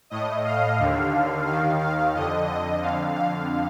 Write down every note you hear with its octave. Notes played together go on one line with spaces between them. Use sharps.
A2 D#5
F5
D#2 D3
D#2 D#3 F5
F5
F2 D3 D#5
D#5
F2 D3 F5
F5